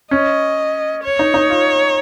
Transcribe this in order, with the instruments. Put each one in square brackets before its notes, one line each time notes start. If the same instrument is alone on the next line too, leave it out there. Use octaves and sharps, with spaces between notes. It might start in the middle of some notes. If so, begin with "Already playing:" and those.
[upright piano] C#4 [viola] D#5
[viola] C#5
[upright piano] D#4
D#4
F4